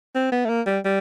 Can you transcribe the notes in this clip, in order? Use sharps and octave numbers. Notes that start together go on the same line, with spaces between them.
C4
B3
A3
A#3
G3
G3